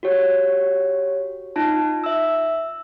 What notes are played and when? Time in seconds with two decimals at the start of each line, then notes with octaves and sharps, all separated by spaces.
0.03 F#4 G4 C#5
1.56 D#4 F4 A5
2.04 E5 E6